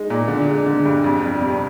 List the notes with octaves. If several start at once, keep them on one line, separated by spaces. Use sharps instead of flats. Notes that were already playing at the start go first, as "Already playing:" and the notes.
Already playing: G#3 D#4
A#2
D3
G#3
D3
G2
F2
G3
C3